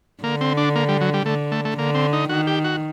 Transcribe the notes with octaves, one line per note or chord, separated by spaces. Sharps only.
D3 A#3
C4
D4
A#3
G3
F#3
G3
D3 A3
A3
A3
D3 A#3
C4
D#4
D#3 F#4
G4
F#4